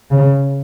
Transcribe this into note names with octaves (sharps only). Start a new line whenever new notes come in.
C#3